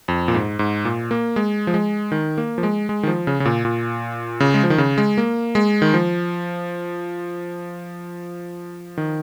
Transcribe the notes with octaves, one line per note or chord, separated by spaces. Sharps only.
F2
A#2
G#2
G#2
A#2
A#3
G#3
F3
G#3
D#3
A#3
F3
G#3
G#3
D#3
F3
C#3
C#3
A#2
A#2
C#3
G#3
F3
D#3
C#3
G#3
A#3
G#3
D#3
F3
D#3